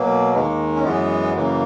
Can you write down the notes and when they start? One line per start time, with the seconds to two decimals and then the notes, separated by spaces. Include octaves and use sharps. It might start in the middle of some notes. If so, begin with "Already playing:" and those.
Already playing: B2 F#3 A#3
0.34 D#2 D#3 G#3 A#3
0.76 C#4
0.84 F#2 E3 G#3 B3
1.36 F#2 C#3 E3 A#3